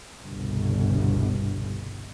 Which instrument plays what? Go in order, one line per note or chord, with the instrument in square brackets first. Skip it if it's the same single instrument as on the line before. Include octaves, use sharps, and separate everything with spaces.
[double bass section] G1 C2 B2